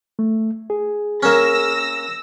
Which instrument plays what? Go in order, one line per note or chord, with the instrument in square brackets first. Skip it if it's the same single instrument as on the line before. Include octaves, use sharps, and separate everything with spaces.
[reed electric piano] A3
G#4
[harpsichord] A#3 C#4 [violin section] E6 A#6